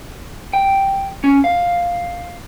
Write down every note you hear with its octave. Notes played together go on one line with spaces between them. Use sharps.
G5
C#4
F5